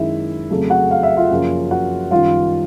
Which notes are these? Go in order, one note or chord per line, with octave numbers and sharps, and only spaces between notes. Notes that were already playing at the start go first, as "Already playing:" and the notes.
Already playing: F#2 D#3 G#3 E4 E5
F2 C#3 F#3 A3
F#4 F#5
F5
E5
F4 F5
F#2 C#3 F3 A#3
F#4 F#5
F#2 D#3 G3 F4 F5